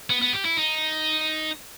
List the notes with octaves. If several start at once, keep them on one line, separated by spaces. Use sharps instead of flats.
B3
B3
G4
E4
D#4